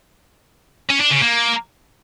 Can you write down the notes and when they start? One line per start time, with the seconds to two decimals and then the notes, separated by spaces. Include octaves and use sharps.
0.89 C#4
1.00 D4
1.11 C#3
1.21 A#3